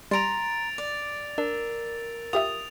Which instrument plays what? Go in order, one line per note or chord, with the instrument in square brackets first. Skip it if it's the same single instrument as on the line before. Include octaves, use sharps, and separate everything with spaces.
[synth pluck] G3 [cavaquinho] A#5 C6 [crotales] A6 D7 F7
[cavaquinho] D5
[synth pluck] D4 [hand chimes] A#4
[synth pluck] F4 G4 E5 [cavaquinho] D#6 [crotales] F7